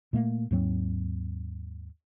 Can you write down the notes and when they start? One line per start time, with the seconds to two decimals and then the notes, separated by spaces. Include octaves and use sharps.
0.13 A#2 A3 A#3
0.51 D#2 G#2 F#3 C4